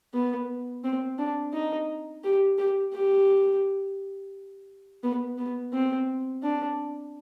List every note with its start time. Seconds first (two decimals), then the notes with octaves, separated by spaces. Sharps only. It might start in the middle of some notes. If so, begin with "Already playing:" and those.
0.14 B3
0.84 C4
1.18 D4
1.53 D#4
2.24 G4
2.58 G4
2.93 G4
5.04 B3
5.38 B3
5.73 C4
6.43 D4